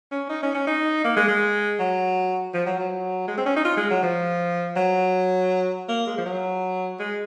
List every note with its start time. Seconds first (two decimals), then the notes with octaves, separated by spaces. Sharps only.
0.12 C#4
0.29 D#4
0.43 C#4
0.54 C#4
0.67 D#4
1.05 A#3
1.17 G#3
1.29 G#3
1.80 F#3
2.54 F3
2.66 F#3
2.78 F#3
3.28 G#3
3.38 C4
3.46 C#4
3.56 D#4
3.65 F4
3.77 G#3
3.91 F#3
4.02 F3
4.76 F#3
5.89 A#3
6.07 G#3
6.18 F3
6.26 F#3
7.00 G#3